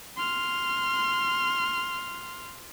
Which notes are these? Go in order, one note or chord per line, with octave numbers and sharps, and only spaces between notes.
C6 F6